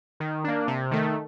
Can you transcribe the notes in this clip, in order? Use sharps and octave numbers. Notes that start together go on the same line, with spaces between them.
D#3
A#3 D4
C3
D#3 A3